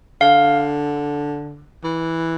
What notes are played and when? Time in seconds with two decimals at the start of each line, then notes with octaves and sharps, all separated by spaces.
0.21 D3 F5
1.84 E3